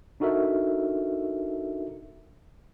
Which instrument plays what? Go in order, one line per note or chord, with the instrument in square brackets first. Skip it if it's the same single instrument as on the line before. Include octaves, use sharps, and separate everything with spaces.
[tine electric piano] D4 D#4 F#4 A4 A#4 E5